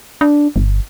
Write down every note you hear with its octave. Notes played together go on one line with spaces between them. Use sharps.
D4
G1